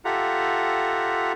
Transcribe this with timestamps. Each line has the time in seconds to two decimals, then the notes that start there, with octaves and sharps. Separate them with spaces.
0.05 F4 G4 A4 E5 F#5 A#5